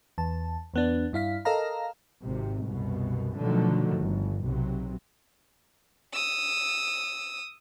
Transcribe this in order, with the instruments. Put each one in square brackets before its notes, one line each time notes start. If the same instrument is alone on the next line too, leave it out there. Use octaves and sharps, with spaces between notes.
[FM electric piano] E2 A5
E2 B3 D4
G2 E4 F5 B6
A4 A#4 D#5 F5 A#5
[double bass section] G#1 C3
C2 F#2 B2
B2 D3 D#3 F3 F#3 A3
G1 G2
B1 C3 F#3
[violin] D#6 E6